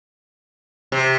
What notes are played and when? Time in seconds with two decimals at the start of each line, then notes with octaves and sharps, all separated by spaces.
0.92 C3